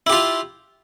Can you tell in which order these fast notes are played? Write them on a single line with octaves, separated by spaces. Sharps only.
E4 G4 F4